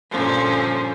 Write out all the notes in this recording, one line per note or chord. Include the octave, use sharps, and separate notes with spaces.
G2 A#2 D3 F3 C#4